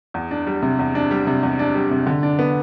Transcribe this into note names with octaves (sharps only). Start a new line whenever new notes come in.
E2
D4
G3
C3
E2
D4
G3
C3
E2
D4
G3
C3
D3
D4
B3